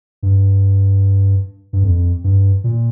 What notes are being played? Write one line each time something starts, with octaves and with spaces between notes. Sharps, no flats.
G2
G2
F2
G2
A#2